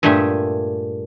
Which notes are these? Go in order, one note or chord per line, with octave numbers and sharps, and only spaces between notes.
G2 A#2 A3 G4 G#4 E5